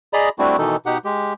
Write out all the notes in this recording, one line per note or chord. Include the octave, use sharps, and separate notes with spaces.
G#4 D5 D#5 A#5 B5
G3 A3 C4 D4 E4 F#4
B2 D#3 E3 D#4 A4
B2 D#4 G4 F#5
G#3 G4